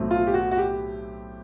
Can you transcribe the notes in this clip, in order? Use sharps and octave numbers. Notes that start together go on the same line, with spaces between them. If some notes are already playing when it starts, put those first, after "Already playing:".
Already playing: B1 A2 F#3 A3 C4
F4
G4
F#4
F#4
G4